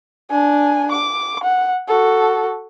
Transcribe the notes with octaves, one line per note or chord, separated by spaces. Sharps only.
D4 G#5
D6
F#5
F#4 A4